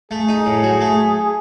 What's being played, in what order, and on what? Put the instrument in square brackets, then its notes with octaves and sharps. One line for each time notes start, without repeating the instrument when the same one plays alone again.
[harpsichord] A3 [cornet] G#4
[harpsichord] D#4
A2
F#3
A3